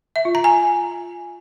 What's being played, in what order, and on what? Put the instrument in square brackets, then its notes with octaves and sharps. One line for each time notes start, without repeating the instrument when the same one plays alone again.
[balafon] E5
F4
A#5
G#5